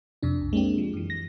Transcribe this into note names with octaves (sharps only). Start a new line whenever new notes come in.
F2 C3 D4
B1
G#3 A#3 C4 D4 G4
F3
F#2 E3
A#6